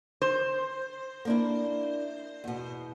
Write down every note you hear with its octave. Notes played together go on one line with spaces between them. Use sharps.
C5
A#3 D4 E4
E2 B2